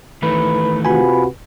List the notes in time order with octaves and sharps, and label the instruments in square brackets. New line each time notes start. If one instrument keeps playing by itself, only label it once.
[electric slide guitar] D#3 E3 A3 [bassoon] B4
[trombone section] C3 F4 F#4 [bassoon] B4 [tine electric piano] G#5 B5